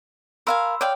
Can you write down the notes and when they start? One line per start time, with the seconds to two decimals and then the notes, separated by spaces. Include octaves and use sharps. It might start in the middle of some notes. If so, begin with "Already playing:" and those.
0.47 A#4 F5 G#5 B5 C6 E6
0.81 C#5 D5 F5 G5